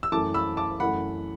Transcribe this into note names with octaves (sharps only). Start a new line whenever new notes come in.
E6
F#2 E3 A3 A5 D6
B5 E6
A5 D6
F#2 E3 A3 F#5 B5